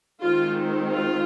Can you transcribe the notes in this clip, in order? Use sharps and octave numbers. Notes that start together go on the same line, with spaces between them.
D#3 G#3 C4 F4
F4